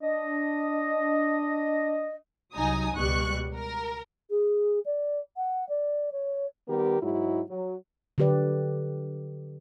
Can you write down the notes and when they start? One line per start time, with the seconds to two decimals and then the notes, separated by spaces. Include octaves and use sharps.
0.02 D4 D#5
2.55 C2 F#3 D#4 G#5 A#5 D#6
2.96 C#2 B2 G3 C#6 F#6
3.55 A#4
4.30 G#4
4.86 D5
5.37 F#5
5.69 D5
6.12 C#5
6.68 D#3 G3 B3 G4 A#4
7.01 G#2 F#3 G#3 E4 F#4
7.49 F#3
8.18 D3 F#3 G4 B4 D5